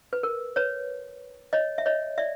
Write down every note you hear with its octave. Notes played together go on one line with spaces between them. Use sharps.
B4
A#4
B4 C#5
C#5 D#5
E5
C#5 D#5
D5 E5